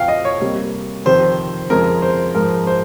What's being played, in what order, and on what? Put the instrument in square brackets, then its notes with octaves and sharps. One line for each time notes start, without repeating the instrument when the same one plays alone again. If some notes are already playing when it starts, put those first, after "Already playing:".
Already playing: [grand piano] F2 C3 F3 F5 G5
D#5
C#5
C3 G3 A#3
F2 C3 D#3 C5
F2 C#3 G#3 A#4
C5
G#2 F3 G#3 A#4
C5